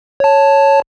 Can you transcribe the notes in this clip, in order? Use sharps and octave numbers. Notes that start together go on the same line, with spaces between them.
C#5 A5